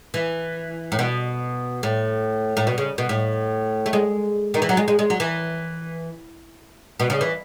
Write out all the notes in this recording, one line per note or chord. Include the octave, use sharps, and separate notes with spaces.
E3
A2
B2
A2
A2
B2
C#3
B2
A2
A3
G#3
D#3
E3
F#3
G#3
G#3
G#3
F#3
E3
B2
C#3
E3